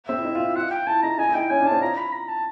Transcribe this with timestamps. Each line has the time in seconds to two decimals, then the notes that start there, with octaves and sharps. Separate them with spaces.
0.08 C4 E5
0.19 E4
0.25 D#4
0.35 F4
0.40 E4
0.55 F4 F#5
0.71 G5
0.87 E4 A5
1.03 D#4 A#5
1.18 D#4 G#5
1.29 E4
1.34 D#4 G5
1.50 C#4 G#5
1.61 D4
1.66 A5
1.71 C4
1.81 F4 A#5
1.98 B5
2.13 A#5
2.28 A5